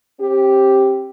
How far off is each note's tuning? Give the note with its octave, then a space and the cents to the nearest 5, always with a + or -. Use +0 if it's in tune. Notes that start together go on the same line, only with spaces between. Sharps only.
C4 +40 G4 +0